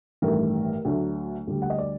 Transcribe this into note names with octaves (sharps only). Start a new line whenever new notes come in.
A1 G2 D#3 A3 A#4
D2 D3 F#3 A3
D2 D3 G3
F#5
D#5
D5